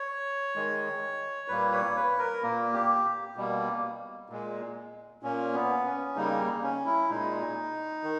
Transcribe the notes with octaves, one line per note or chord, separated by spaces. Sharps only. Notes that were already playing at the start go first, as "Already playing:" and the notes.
Already playing: C#5
D#3 G#3
A#2 G3 A#3 B4
C#5
B4
A#4
A#2 A#3
G4
B2 G3 A#3
A#2 G#3
A#2 A#3 C#4
B3
C#4
C#3 G3 A#3 D#4
C#4
E4
A#2 G#3 D#4
D#3